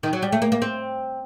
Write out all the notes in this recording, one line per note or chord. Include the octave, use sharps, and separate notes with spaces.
D#3
F#3
G3
A3
A#3
A#3
C4